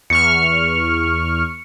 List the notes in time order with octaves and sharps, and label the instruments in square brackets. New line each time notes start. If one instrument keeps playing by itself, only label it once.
[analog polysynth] E2 C#6 F6 [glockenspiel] C#7